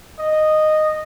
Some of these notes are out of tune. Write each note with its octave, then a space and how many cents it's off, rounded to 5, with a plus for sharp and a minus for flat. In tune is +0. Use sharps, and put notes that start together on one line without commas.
D#5 -10